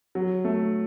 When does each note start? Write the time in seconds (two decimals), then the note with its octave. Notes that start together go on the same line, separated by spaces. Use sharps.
0.15 F#3
0.44 A3